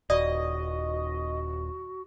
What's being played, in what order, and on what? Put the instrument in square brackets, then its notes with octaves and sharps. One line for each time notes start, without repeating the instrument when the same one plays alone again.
[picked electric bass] D#1 [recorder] F#4 [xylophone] D5 [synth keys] D#5